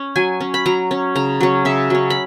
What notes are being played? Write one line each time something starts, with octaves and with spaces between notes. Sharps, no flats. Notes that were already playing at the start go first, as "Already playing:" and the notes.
Already playing: C#4
F#3 G#5
C#4
B5
F#3 A#5
C#4
C#3 A#5
F#3 C#4
C#3 E5
F#3 C#4
B5